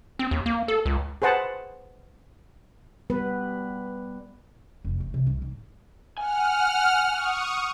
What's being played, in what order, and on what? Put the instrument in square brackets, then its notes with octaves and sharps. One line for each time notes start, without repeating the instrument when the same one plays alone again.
[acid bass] C4
D#2
A#3
A4
C#2
[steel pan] G#4 B4 C5 F#5 A5
[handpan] G3 B3 B4
[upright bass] F1
A3
C3
C2
G#2
[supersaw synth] F#5 F6 [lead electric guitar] G#5
[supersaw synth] C#6 D#6